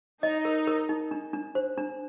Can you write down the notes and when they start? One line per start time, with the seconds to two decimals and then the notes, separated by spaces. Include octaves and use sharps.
0.23 D#4 D#5
0.45 A#4
0.67 A#4
0.89 D#4
1.11 D4
1.33 D4
1.55 C5
1.78 D4